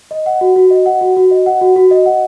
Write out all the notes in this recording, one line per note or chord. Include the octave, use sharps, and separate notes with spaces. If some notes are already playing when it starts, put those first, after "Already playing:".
D#5
F#5
F#4
F#4
D#5
F#5
F#4
F#4
D#5
F#5
F#4
F#4
D#5
F#5